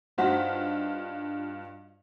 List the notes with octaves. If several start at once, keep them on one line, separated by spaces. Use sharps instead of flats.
G2 D#4 F4 F#4 C5 B6